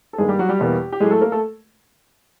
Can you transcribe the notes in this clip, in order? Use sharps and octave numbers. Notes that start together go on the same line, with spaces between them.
A4
G2 D#3 G3 G#3 A#3 G#4
G3 G4
F#3 F#4
G3 G4
E2 B2 G3 A#3
G4
A2 F#3 G#3 A3 G#4
A3 A4
A#3 A#4
A3 A4